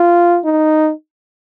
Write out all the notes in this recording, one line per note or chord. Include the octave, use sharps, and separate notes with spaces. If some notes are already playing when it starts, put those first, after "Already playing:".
Already playing: F4
D#4